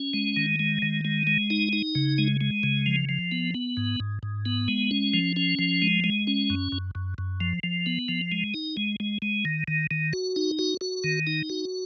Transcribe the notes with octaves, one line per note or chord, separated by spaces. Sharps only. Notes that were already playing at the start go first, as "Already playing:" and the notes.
Already playing: C#4
G#3
D#3
G#3
D#3
G#3
G#3
D#4
D#4
C#3
G#3
G#3
C#3
F3
F3
B3
B3
G#2
G#2
G#2
B3
G#3
C#4
F3
C#4
F3
G#3
G#3
C#4
F#2
F#2
F#2
F#2
F3
F3
B3
F3
G#3
D#4
G#3
G#3
G#3
D#3
D#3
D#3
F#4
D#4
F#4
F#4
D#3
D#4
F#4